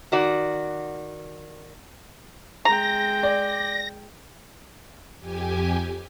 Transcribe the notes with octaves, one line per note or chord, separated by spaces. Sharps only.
D#3 F#4 D5
G#3 G5 A#5 A#6
D5
F2 G4 G#5